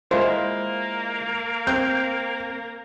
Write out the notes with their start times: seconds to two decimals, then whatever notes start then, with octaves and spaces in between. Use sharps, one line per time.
0.11 G#3 A#3 E4 F4 C5
1.67 C4 G6